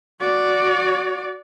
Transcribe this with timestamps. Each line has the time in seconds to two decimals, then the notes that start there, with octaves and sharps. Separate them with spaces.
0.20 F#4 D5